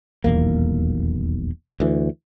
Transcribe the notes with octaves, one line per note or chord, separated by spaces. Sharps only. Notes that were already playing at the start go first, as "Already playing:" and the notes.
D#1 B1 E2 A#3
D2 E3